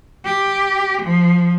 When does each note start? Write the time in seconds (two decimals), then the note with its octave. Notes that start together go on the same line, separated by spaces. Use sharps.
0.25 G4
1.02 F3